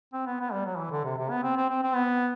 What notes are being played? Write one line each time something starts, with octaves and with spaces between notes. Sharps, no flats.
C4
B3
B3
G3
F#3
E3
D3
C3
C3
B3
C4
C4
C4
C4
B3